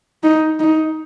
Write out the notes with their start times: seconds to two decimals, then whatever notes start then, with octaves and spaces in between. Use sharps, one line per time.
0.24 D#4
0.60 D#4